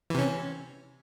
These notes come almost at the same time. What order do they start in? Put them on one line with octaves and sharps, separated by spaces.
E3 C3 C#4